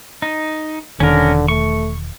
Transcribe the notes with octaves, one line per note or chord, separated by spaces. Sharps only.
D#4
E1 D3 D#3 C#4 A#4
A3 C#6